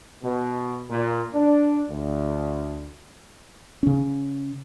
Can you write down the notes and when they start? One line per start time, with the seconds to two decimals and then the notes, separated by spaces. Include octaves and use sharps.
0.23 B2
0.89 A#2
1.33 D4
1.89 D2
3.83 C#3 C#4